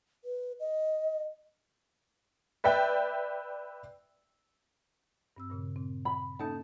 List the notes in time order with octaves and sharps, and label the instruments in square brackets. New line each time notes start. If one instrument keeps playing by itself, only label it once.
[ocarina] B4
D#5
[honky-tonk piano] B4 D5 E5 G5
[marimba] G2 C4 E6
G2 A#2 C#3
A#2 C4
[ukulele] B5
[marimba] A#3 C#4 A4 [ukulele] D#4 A5